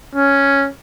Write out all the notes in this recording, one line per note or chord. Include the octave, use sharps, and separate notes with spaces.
C#4